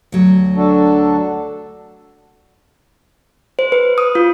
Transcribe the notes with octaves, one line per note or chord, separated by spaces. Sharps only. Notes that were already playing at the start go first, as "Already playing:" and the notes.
D2 F#3
D4 F#4 A4
C5
B4
D#6
F4